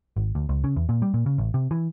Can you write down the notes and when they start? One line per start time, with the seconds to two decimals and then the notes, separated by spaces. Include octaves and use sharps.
0.16 G#1
0.35 D2
0.49 C#2
0.64 C#3
0.76 E2
0.89 A#2
1.02 G3
1.14 A#2
1.26 C#3
1.38 A1
1.54 C3
1.71 E3